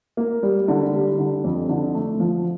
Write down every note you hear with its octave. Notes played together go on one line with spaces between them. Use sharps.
A#3
G3
D3
G3
D3
F2
D3
A3
F3